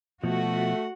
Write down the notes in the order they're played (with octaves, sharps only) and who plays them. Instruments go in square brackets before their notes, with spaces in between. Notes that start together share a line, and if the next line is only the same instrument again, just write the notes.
[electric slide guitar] B2 F3 [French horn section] A3 [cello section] F#4 [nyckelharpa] F#5